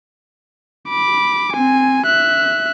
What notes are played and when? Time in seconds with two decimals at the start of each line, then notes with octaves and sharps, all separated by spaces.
0.89 B5 D6
1.53 C4 G#5
2.06 E5 F#6